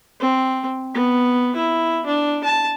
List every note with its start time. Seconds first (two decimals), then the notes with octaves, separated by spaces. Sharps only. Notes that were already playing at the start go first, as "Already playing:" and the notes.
0.20 C4
0.94 B3
1.56 E4
2.06 D4
2.44 A5